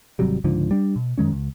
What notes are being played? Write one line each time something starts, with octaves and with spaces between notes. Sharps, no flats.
G#1 C3 F#3 G3
C#2 G#2 D3 F3
G3 D4
B2
F#2 D#3 G#3 C#4
C#2